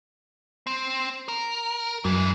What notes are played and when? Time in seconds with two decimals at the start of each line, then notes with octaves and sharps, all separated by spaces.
0.67 C4
1.28 A#4
2.05 F#2 E3 G#3